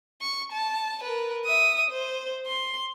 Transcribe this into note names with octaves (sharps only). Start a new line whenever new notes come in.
C#6
A5
A#4 B4
E5 D#6
C5
C6